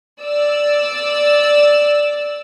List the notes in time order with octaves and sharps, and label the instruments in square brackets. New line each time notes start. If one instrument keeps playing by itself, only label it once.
[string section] D5 E6